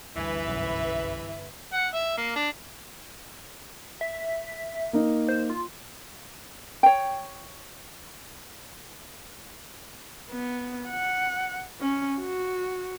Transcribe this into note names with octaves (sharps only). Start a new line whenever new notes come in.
G1 D2 G2 E3 B4 E5 G#5
B1 F#2
F#5
E5
A#3
D4
E5
A#3 D#4
C5
F4
C#5 G5
B3
F#5
C#4
F#4